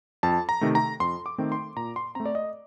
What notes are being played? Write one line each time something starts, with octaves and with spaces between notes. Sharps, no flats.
F2 A5
A#5
C3 D#3 A3
A#5
F2 C6
D6
D#3 A3 C4
C6
A#2 A#5
C6
A3 C4 A#5
D5
D#5